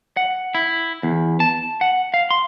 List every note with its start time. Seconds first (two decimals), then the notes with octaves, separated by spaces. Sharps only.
0.17 F#5
0.55 E4
1.03 E2
1.40 A5
1.81 F#5
2.14 F5
2.31 C6